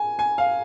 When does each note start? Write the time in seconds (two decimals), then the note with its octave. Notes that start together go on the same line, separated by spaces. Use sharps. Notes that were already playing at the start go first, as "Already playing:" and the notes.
Already playing: G#5
0.19 G#5
0.38 F5